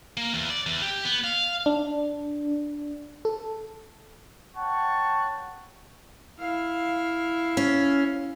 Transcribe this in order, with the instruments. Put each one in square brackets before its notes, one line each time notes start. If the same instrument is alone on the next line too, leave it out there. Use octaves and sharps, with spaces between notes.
[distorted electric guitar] A#3
E2
D5
E2
G4
B3
F5
[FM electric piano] D4
A4
[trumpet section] C#5 F#5 G5 A5 C#6
[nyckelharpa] E4 F5
[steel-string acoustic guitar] C#4